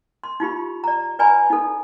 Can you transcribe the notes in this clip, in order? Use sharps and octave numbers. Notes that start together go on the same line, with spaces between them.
C6
D#4 F4 G4 B5
D5 A#5
B4 D5 G#5 A#5 B5
D#4 A4